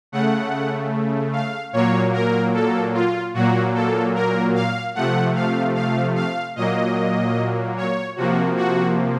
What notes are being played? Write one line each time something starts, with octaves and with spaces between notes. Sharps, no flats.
C#3 A3 F#5
F5
A#2 F#3 A#3 C#5
A#4
A4
F4
A#2 F#3 A#3 F#4
A4
A#4
F5
C3 F3 A3 F#5
F5
F5
F5
A#2 F#3 A#3 D#5
C#5
C3 F3 A#3 F#4
F#4